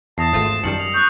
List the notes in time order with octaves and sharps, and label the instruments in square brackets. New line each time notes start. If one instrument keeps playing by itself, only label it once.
[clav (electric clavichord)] E2 [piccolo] A5 [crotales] D#6 A#6 C7
[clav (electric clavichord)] G#1 A3 F4
[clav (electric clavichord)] F#2 D#3 G3 [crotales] C#7 F#7
[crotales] F7
[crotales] C#6 D#6 F#6 [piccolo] G6